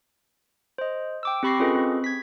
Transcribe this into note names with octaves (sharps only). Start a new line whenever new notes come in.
C5 D#5
G5 D6 E6
C4 G4 B5 C#6 A#6 C7
C#4 F4 G#4 A4 B4 D#5
C4
G#6 B6